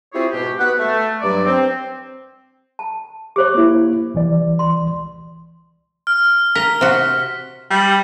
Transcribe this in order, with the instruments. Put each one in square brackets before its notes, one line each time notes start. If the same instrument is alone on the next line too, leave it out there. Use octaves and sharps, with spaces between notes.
[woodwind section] C4 E4 F4 G4 G#4 C#5
G#2 B2 F#4 G4
B3 B4 F#5
A3
G2 F#3 D5
C4
[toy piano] A5
[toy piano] G4 C5 C#5 [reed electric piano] D6
[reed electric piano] A#3 E4
C2 E3 D5
[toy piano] C6
[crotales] F6
[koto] A#4 [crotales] B6
[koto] C3 F#4
[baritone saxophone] G3